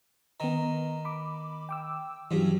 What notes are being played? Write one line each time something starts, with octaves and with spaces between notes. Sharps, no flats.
D#3 B3 A#5
B5 D6
G5 D6 E6
G2 C#3 E3 F#3